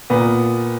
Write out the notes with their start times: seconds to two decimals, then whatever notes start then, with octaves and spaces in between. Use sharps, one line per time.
0.10 A#2 B3